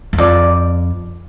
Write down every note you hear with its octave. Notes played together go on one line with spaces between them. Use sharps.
E2
F2 D5